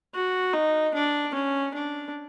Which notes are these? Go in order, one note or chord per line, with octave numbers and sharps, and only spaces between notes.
F#4
D#4
D4
C#4
D4